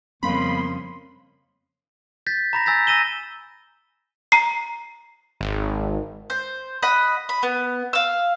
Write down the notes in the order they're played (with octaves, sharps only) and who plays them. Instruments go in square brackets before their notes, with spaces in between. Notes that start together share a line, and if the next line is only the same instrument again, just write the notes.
[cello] F2 C#3 [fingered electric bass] G3 B3 C#4 [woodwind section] A#3 C6 [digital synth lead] B5
[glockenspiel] G6 A6 B6
A#5 B5 A#6
G#5 E6 G6 A6 B6
G#5 E6 A#6 D#7 E7 G7
[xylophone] A#5 C7
[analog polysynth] G#1
[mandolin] C5
D#5 F#5 B5
B5
B3
F5 E6